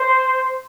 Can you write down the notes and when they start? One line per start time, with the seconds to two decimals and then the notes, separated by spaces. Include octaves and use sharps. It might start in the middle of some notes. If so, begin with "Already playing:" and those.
Already playing: C5